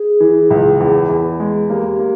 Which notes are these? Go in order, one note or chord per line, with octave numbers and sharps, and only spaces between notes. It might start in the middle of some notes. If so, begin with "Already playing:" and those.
Already playing: G#4
E3
C#2
E2
E2
G#3
A#3 G4
A#3